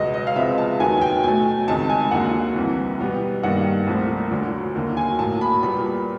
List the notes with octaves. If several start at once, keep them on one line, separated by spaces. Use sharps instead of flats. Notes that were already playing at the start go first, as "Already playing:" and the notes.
Already playing: C#2 B2 F#3 B3 D#5
D#5
F5
C#2 C3 F3 G#3 B3 E5
A5
D#2 D#3 F#3 B3 G#5
G#5
G5
B2 F#3 A3 G#5
C#2 C3 D#3 A5
G#5
D#2 D3 F#3 A#3 F#5
C2 C3 E3
B2 G3 B3
G2 D#3 G3 A#3 F#5
C2 A#2 F3 A3
D2 D3 F#3
D#2 D3 F#3 A#3
G#5
A2 F#3 A#3 A5
B5
A#2 G3 B3 B5